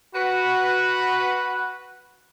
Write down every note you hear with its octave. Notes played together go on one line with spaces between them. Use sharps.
F#4 B4